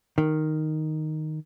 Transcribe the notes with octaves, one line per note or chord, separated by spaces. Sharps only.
D#3